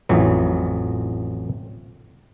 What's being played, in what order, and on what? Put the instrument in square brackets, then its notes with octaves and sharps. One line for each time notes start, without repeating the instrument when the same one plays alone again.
[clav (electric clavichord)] A1 F2 E3 F#3